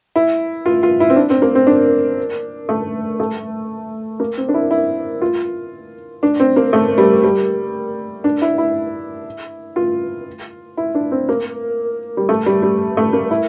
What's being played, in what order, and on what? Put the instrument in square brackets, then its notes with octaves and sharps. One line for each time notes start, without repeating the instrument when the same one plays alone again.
[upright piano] E4
F4
F4
E4
C4
D4
C4
A#3
C4
D4
A3
A3
A#3
C4
D4
E4
E4
F4
D4
C4
A#3
A3
G3
G3
D4
E4
E4
F4
E4
D4
C4
A#3
G3
A3
G3
G3
A3
A#3
E4